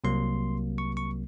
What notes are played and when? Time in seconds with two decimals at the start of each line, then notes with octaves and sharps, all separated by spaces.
0.04 C2 C3 F#3 A#3 C6
0.78 C#6
0.97 C#6